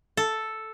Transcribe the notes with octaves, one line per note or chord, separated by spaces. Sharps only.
A4